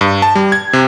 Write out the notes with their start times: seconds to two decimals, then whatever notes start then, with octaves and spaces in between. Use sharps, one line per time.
0.01 G2
0.22 A5
0.35 G3
0.52 G#6
0.73 C3